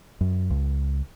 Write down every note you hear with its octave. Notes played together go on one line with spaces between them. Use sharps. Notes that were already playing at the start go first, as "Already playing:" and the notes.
F#2
C#2